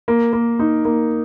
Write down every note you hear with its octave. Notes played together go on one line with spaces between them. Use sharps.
A#3
A#3
D#4
A#3